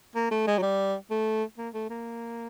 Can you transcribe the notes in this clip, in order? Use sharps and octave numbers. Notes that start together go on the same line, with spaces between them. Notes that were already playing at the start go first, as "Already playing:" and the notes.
A#3
A3
G#3
F#3
G3
A3
A#3
A3
A#3